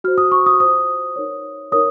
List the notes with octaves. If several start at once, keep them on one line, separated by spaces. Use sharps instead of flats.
F#4 C5 F6
D#6
C#6
D#6
F4 C5 D#6
D#4 A#4 C#5
D#4 A#4 C#5 D#6